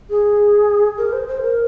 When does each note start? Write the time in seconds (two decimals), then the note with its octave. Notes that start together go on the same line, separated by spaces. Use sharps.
0.10 G#4
0.97 A#4
1.12 C5
1.28 C5
1.41 A#4